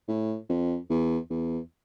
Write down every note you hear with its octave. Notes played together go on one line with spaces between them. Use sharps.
A2
F2
E2
E2